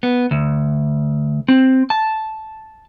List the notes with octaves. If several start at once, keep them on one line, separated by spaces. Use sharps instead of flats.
B3
D2
C4
A5